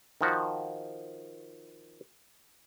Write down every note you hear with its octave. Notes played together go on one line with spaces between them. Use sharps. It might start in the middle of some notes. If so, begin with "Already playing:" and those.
D#3 F3 F#4